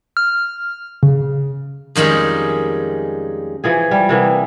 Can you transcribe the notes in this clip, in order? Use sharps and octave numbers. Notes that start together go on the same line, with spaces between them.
F6
C#3
F2 D#3 G3 G#3 C#4
E3 F3 G#4
G3
C3 E3 A#3 B3